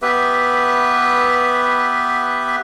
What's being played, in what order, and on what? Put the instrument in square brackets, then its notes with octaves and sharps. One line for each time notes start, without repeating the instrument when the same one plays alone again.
[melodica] B3 G4 B4 E5